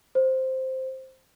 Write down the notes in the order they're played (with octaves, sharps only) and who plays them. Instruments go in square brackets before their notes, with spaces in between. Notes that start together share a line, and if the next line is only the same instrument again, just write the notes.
[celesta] C5